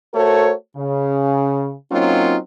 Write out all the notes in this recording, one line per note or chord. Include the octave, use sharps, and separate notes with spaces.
A3 F#4 A4 A#4 C5 C#5
C#3
F#3 A#3 C4 C#4 D#4 F4